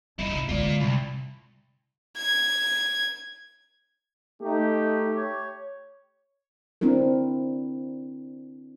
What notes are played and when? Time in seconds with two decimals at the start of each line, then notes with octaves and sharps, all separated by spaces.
0.19 G2 D#4 E4
0.32 C3
0.49 D3 G#3 F4 D5
0.80 C2
2.17 G#6
4.42 A3 D#4 G4
5.14 C#5
6.81 C4 D4 E4 A#4